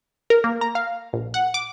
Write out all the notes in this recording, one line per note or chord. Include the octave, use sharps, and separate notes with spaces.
A#4
A#3
A#5
F5
A#1
F#5
D6